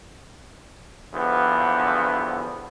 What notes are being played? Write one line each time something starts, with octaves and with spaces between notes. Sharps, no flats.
E2 G2 D3 F3 B3